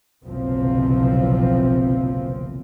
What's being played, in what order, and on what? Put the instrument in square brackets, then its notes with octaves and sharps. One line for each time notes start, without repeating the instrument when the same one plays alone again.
[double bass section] F#1 B1 C3 E3 F3 C4